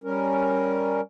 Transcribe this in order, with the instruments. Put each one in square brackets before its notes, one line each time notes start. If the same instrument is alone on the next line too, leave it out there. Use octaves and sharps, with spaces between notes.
[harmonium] G3 C#4 A#4